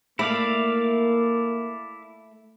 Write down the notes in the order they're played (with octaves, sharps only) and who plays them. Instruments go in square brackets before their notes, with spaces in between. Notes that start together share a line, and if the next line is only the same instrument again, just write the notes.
[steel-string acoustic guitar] A3 [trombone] A#3 [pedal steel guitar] E4 D5 F5